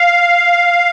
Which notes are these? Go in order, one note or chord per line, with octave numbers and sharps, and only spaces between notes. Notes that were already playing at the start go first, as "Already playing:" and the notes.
Already playing: F5